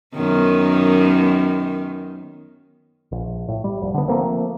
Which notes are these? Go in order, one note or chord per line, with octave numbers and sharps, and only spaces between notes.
F#2 D#3 B3
A#1
A2
G3
F1
D3 B3
F3 A3 A#3 C4